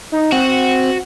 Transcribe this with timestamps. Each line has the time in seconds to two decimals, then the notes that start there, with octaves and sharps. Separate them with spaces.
0.12 D#4
0.32 C4 F#4